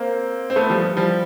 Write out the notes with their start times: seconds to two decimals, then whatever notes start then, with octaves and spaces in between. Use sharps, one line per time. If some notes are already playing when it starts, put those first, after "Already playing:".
Already playing: A#3 C4
0.50 C4
0.56 A3 B3
0.70 F3 G3
0.97 F3 G3